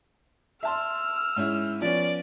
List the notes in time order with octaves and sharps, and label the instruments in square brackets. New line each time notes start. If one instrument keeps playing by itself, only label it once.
[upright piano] E5 A5 C6 [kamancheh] E6 F6
[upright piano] G#2 C#4 E4
[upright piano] F3 B3 C#4 [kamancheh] D5